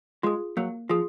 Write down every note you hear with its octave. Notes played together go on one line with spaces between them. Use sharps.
G#3 F4 G#4
F#3 A#3
F3 F4 G#4